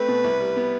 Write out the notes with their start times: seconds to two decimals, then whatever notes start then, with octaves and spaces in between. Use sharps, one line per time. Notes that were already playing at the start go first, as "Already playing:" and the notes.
Already playing: A3 C4 B4
0.08 B2
0.24 C2
0.40 G3
0.56 B3